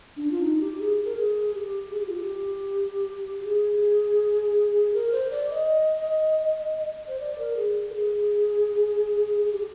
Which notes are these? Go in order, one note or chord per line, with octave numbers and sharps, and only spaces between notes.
D4
F4
D#4
G4
G#4
A#4
G#4
G4
G#4
G4
F4
G4
G#4
A#4
C5
D5
D#5
C5
D5
A#4
G#4
A#4
G#4
G#4
G4